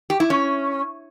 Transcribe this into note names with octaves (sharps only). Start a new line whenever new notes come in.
G4
E4
C#4